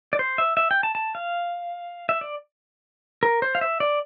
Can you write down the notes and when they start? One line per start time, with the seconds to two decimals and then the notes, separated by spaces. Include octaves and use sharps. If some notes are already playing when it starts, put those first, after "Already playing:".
0.13 D5
0.19 C5
0.38 E5
0.57 E5
0.71 G5
0.83 A5
0.95 A5
1.15 F5
2.09 E5
2.21 D5
3.23 A#4
3.42 C5
3.55 F5
3.61 E5
3.80 D5